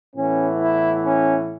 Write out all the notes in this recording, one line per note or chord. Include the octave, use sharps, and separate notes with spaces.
A2 E3 B3 C#4
E4
C#4